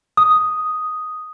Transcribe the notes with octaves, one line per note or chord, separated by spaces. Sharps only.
D#6